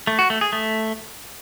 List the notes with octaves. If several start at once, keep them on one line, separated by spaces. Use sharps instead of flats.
A3
F#4
A3
G#4
A3